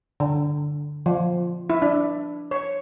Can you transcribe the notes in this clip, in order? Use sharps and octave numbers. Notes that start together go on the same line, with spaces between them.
D3
F3
E4
D4
C#5